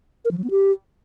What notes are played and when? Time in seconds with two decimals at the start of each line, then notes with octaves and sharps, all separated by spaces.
0.25 A#4
0.31 F3
0.38 F#3
0.44 B3
0.50 G4